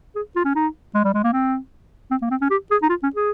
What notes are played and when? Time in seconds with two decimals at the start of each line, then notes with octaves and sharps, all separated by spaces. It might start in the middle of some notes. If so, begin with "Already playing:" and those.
0.15 G#4
0.36 F4
0.45 C#4
0.55 D#4
0.95 G#3
1.04 G3
1.14 G#3
1.24 A#3
1.33 C4
2.11 C4
2.22 A#3
2.31 C4
2.41 C#4
2.50 G4
2.71 G#4
2.82 D#4
2.89 F4
3.03 C#4
3.16 G#4